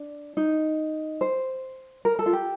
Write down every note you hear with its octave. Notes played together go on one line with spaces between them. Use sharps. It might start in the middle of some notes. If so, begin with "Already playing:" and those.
Already playing: D4
D#4
C5
A#4
A4
F4
G4